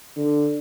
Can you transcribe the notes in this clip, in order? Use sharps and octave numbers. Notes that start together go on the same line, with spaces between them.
D3